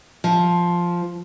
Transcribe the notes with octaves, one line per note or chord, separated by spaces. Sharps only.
F3